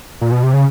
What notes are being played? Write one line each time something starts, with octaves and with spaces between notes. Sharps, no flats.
A#2
B2
C3
C#3